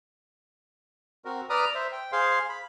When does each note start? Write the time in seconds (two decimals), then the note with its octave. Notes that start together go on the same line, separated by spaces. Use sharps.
1.25 C4 F#4 A#4
1.50 B4 D5 A#5 D#6 F6
1.75 C5 E5
1.92 G5
2.12 G#4 C5 F5 C6
2.49 B5